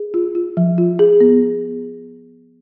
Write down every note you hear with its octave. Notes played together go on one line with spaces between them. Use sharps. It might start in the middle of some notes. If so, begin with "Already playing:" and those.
Already playing: G#4
F4
F4
F3
F4
G#4
B3